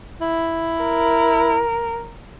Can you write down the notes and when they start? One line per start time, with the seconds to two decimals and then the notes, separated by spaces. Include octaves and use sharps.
0.21 E4
0.83 A#4